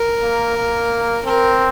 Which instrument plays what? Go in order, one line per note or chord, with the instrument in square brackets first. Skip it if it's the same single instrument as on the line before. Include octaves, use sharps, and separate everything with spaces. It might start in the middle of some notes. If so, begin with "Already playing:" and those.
Already playing: [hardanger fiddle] A#4
[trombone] A#3
A#3
[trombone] C4 [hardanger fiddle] A#4